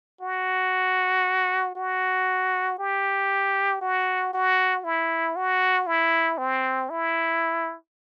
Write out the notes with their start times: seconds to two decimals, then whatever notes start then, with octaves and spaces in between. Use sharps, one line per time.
0.21 F#4
1.75 F#4
2.79 G4
3.81 F#4
4.34 F#4
4.84 E4
5.36 F#4
5.87 E4
6.38 C4
6.90 E4